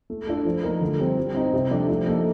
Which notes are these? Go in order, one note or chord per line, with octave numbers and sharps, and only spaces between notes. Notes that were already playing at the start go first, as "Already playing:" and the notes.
A3
D4 F4 A4
F3
A3 D#4 A#4
D3
G3 C4
G3
C4 D#4
C3
F3 A3 D4
F3
A#3 D#4 A4